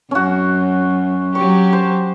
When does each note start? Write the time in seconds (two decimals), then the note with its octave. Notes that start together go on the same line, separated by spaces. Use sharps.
0.11 F#2 C#4 F#4
1.35 F#3 G4 C#5
1.73 C5